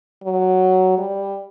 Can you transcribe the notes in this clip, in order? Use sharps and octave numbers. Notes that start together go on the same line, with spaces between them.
F#3
G3